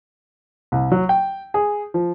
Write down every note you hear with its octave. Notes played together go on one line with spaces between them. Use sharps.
C2
F#3
G5
G#4
F3